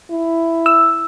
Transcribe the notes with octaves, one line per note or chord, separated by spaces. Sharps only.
E4
E6